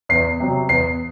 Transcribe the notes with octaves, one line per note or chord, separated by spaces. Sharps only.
E2 C7
C3 F#3
E2 C7